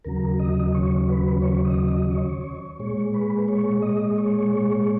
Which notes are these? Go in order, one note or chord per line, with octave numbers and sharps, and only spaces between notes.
D#2 C#3 F#3 A#4
D#5
C#5
B4
C#5
D#5
D#5
C#5
A#2 G#3 C#5
B4
C#5
D#5
C#5